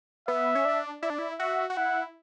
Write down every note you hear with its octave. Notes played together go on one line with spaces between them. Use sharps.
B3 E5
C#4
D4
E4 D5
D4
E4
F#4 E5
F#4
E4 F#5